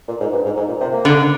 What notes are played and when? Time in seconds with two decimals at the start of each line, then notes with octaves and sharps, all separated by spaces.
0.08 A#2
0.20 G#2
0.32 G2
0.44 G#2
0.57 G#2
0.69 A#2
0.81 C3
0.93 A#3
1.05 D3